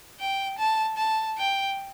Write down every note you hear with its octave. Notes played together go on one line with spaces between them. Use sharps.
G5
A5
A5
G5